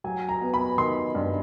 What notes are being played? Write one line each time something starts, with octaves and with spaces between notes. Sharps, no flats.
F#3 G#5
A#5
B3
B5
D#3 C6
G2